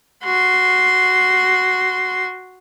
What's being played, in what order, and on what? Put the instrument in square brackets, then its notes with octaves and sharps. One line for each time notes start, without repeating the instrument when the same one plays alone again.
[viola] F#4 C6